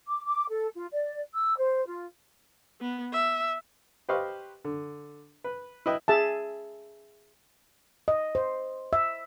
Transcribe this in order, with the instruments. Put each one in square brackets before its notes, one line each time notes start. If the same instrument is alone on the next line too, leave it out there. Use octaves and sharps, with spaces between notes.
[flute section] D6
D6
A4
F4
D5
E6
C5
F4
[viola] B3
E5
[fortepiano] G4 B4 C5 D#5 F5 C#6
D3
B4
E4 B4 D#5 G5
[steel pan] G#4 E5 A5
[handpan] D#5
C5
E5